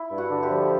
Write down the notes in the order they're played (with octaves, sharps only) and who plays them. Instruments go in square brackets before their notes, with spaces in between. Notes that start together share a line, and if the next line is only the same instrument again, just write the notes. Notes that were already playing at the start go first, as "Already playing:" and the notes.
Already playing: [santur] E4
[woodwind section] G2
[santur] F#4
[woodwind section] D3
[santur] G4
[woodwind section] F3